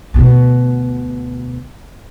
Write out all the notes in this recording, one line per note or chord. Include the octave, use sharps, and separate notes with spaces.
D2 B2